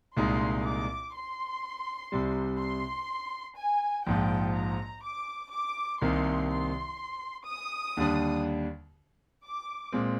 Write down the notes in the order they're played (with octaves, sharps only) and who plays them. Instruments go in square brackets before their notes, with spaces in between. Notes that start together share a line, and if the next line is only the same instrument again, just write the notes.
[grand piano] C2 A#2 G#3 D#4 [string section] C6
[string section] D6
C6
[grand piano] C2 C3 G3
[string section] C6
G#5
[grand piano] A#1 G#2 F3 [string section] G5
[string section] A#5
D6
D6
[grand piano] C2 C3 D#3 A#3 [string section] C6
[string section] C6
D#6
[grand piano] D#2 D3 G3 D4
[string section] D6
[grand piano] A#2 G#3 C4